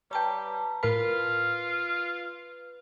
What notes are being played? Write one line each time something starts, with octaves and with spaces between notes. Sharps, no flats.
G3 B4 C#5 G5 A5 A#5
A2 F4 A#4 B4 B5